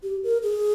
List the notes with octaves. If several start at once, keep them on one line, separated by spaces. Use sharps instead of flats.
G4
A#4
G#4